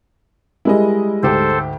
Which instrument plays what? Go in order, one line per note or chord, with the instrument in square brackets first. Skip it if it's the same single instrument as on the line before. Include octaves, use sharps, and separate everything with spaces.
[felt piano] G3 G#3 [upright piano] E4 A#4 D#5
[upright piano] D2 G#2 G4 [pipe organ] A4 C5